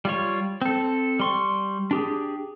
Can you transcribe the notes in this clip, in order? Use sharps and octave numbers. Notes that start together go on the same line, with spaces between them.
G3 F4 C#5
C4 A4
G3 C6 C#6
D4 G4 G#4